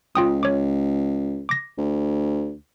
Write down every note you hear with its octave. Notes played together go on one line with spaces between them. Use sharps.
C#2 F4 G5 D#6
C#5 D6
D6 A#6
D2